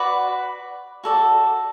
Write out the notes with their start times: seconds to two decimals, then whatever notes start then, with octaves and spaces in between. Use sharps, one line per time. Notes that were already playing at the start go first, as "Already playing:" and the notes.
Already playing: F#4 B4 D5 B5
1.04 F#4 A4 D5